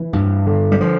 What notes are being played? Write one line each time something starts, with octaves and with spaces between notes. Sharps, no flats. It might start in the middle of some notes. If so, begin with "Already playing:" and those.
Already playing: E3
G2
D3
G3
F3